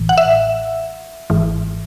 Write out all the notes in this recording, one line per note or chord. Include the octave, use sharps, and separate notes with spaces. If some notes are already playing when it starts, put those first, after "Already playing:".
Already playing: A1 A2 E3
F#5
E5
G#1 G#2 E3